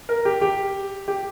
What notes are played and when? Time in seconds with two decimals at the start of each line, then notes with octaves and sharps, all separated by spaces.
0.09 A#4
0.25 G4
0.41 G4
1.08 G4